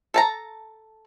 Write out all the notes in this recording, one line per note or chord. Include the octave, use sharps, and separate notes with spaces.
A4 A5 A#5